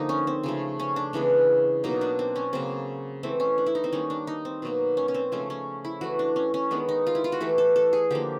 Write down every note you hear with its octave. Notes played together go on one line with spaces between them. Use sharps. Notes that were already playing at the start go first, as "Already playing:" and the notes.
Already playing: D3 F3 A#3 D#4
C#4
C4
C#3 F3 A3
C#4
D4
C#3 E3 G#3 B3
B2 F#3 A#3 D#4
D4
C4
C#4
C#3 F#3 A#3 C4
E3 A3 C4
C#4
D4
E4
D#4
C4
D#3 G3 A#3 C#4
D4
D#4
C4
B2 F#3 A#3
C#4
C#4
C4
C#3 F3 A3 C#4
C#4
E4
E3 A3 F#4
D4
C#4
C#4
D#3 G#3 B3 D4
D#4
F4
E4
F4
F#4
E3 A3 G4
A4
A4
G#4
D3 F3 A#3 G4